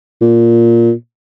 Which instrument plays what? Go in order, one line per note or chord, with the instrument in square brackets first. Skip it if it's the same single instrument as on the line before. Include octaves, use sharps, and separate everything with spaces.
[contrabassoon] A#2